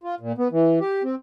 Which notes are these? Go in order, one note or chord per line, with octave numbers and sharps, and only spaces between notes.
F4
A#2
B3
E3
G4
C4